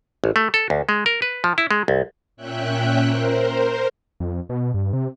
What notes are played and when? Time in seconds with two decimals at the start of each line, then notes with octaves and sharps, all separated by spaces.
0.24 A1
0.36 A3
0.54 A4
0.70 D2
0.89 G#3
1.06 A#4
1.22 B4
1.44 F3
1.58 E4
1.71 G#3
1.88 C2
2.37 A#2 C#4 E5 G5 F#6
3.03 A#4 C5
4.20 F2
4.49 B2
4.74 G2
4.93 C3